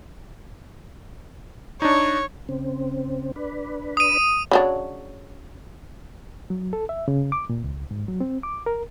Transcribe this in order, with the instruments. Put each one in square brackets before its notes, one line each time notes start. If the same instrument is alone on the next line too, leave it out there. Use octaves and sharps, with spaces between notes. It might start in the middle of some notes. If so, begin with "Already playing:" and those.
[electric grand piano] D4 D#4 [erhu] C#5
[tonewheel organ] C#3 C4
D4 B4
[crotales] D#6 D#7
[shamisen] C#3 F#3 D4
[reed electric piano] F#3
A4
E5
C#3
D6
A#2
C#2
G#2
F#3
C4
D6
A#4